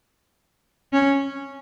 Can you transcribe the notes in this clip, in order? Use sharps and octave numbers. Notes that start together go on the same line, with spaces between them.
C#4